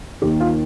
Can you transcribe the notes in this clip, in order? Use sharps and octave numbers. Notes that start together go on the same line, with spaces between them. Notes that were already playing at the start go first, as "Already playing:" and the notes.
D#2 D#3 G4
F4